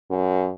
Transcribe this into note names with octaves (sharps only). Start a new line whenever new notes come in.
F#2